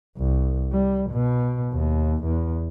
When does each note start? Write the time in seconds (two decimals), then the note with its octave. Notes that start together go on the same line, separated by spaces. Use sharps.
0.17 C2
0.71 G3
1.11 B2
1.73 D#2
2.24 E2